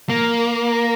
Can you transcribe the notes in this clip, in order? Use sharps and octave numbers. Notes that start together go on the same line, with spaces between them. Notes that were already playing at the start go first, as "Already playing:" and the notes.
A#3